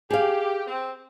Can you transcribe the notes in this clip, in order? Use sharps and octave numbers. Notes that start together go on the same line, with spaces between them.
G4 G#4 F5
C4